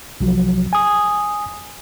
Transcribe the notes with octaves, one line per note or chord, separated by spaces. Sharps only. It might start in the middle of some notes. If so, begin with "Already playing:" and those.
C2 F3 F#3
G#5 D#6